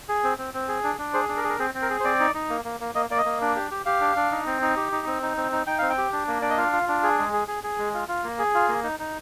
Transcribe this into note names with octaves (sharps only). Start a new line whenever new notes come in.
G#4
C4
C4
C4
G#4
D4
D4
G#4 C5
D4
A#4
G#4
A#4
C4 G#4
C4
A#4
G#4
C5
C4 D5
D#4
D#4
A#3
A#3
A#3
A#3 D#5
A#3 D5
D#5
A#3
D4
G4
G4
G4 F5
D4
D4
D#4
C4
D#4
G4
D#4
C4
D#4
C4
D#4
D#4 G5
C4 F5
G5
G4
D4
A#3
D4 D5
D#5
F4 F5
F4
D4
G#4
G#3
G#4
G#4
G#4
G#3
F4
F4
A#3
G#4
F4
A#3
D#4
D#4